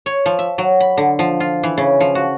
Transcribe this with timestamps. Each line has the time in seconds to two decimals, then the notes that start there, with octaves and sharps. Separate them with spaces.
0.06 C#5
0.26 F3
0.39 E5
0.58 F#3
0.80 B5
0.97 D3
1.19 F3
1.40 F4
1.63 E3
1.78 C#3
2.00 F3
2.15 F#4